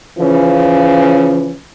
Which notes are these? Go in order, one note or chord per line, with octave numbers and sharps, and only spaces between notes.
C#3 E3 F3 C#4